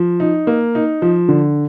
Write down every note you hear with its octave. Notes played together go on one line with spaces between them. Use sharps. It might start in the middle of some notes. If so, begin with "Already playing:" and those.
Already playing: F3
D#4
A#3
D#4
F3
D3